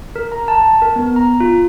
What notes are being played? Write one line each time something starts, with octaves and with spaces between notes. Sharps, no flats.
A#4
A#5
A5
A#4
B3
A#5
F4